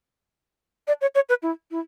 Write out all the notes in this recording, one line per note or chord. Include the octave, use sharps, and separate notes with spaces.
D5
C#5
C#5
B4
E4
E4